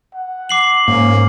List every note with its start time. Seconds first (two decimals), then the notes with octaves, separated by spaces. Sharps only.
0.14 F#5
0.49 D6 C7 F#7
0.88 G#2 A#3 C#4